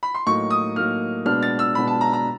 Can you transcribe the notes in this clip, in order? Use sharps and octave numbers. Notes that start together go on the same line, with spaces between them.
B5
C6
A2 F#3 A#3 D#4 C#6
D#6
A2 F#3 A#3 D#4 F6
B2 G#3 B3 D4 F6
A6
E6
B2 G#3 B3 D4 B5
A5
A#5
A#5